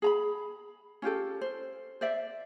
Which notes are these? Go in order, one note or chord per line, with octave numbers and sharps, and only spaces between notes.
G#4 A#5 B5
C#4 F4 G4 A4
C5
C5 D5 E5